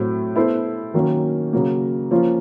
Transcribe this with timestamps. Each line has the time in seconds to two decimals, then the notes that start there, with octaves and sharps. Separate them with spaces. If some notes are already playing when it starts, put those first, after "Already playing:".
Already playing: A2 F#3 A3 C4
0.36 B3 E4 A4 C5
0.94 D#3 F#3 A#3 C#4
1.53 C#3 F#3 A#3
2.11 F3 A#3 C#4 F4